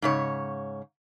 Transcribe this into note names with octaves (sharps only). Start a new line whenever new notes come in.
G#2 C#3 C#5